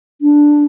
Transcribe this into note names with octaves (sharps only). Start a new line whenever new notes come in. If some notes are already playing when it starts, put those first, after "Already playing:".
D4